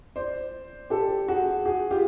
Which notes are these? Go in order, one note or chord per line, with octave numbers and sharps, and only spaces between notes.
C5 D5
G4 A4
F#4 G#4
F#4 G#4
F4 G4